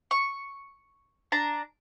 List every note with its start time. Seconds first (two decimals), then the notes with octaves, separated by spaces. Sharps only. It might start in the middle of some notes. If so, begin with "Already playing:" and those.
0.11 C#6
1.32 D4 A5 A#5